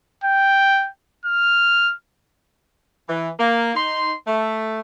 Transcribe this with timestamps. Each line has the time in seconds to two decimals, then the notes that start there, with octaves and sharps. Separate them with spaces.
0.24 G5
1.25 F6
3.08 E3
3.38 A#3
3.75 D#4 C6
4.26 A3